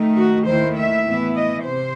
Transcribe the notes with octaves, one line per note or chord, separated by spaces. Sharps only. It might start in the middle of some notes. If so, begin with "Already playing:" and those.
Already playing: D#3 A3 D#4
F#4
D#2 D#3 A3 E4 C5
E5
A2 E3 B3 E4
D#5
C3 C5